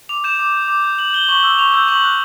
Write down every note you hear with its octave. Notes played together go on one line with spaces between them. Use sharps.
D6 F7
G6 E7
D6
G6
D6
G6
D6 F#7
G6 G7
C#6 F#7
E6 G6
C#6 F7
E6 G6
C#6 F#7
F#6